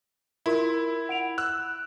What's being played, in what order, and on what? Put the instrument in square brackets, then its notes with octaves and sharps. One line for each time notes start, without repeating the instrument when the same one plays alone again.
[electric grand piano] E4 [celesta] F4 A#4 C6
[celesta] F#5 D7 F7
[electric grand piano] E6 F#6